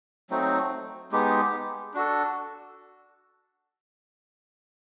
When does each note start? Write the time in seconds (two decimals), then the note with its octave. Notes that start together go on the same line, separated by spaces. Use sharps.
0.30 F#3 A3 C4 D#4
1.12 G#3 B3 D#4 G4
1.94 D4 F#4 A4